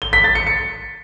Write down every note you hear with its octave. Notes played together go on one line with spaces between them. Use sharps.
G7
B6
A6
C#7
C#7